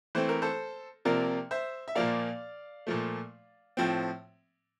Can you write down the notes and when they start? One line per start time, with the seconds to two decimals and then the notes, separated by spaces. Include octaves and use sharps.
0.15 E3 A3 C4 C5
0.29 A#4
0.42 A4 C5
1.05 C3 F3 A#3 A#4 D5
1.51 C5 E5
1.88 E5
1.95 A#2 F3 A#3 D5 F5
2.87 A#2 F3 A3
3.77 A2 F3 C4